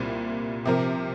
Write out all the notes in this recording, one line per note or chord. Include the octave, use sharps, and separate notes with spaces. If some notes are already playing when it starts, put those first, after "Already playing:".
Already playing: C2 A#2 G3 C4
C3 F3 C4 A#4